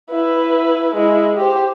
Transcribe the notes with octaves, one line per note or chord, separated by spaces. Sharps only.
E4 B4
G#3 E4
G4 C5